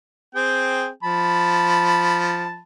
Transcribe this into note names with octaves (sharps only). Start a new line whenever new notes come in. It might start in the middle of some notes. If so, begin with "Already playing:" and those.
C4 G#4 G5
F3 A5 B5